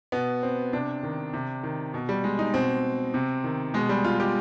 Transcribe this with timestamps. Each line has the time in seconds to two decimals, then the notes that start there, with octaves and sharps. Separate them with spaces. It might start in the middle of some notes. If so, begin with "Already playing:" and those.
0.12 B2 B3
0.43 C4
0.73 C3 D4
1.03 D#3
1.33 C3
1.63 D#3
1.94 B2
2.09 G3
2.24 G#3
2.39 D#4
2.54 B2 C4
3.14 C3
3.44 D#3
3.74 B2 G#3
3.89 G3
4.04 F4
4.20 G4